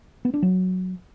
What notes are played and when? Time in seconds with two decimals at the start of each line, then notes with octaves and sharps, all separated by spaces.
0.25 B3
0.34 D4
0.42 F#3